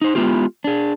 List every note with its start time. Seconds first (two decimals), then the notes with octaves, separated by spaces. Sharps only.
0.02 D#4 C5
0.15 G#3 B3 E4 F4 G4
0.64 D4 G#4